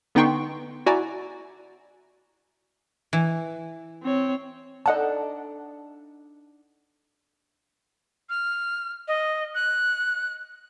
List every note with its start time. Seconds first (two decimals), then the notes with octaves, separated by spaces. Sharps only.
0.15 D3 B3 D#4 G5 C6 C#6
0.86 E4 F#4 D5 G#5 A#5
3.13 E3
4.03 C4 C#5
4.86 D4 D#4 A4 D#5 F#5 A5
8.30 F6
9.08 D#5
9.55 F#6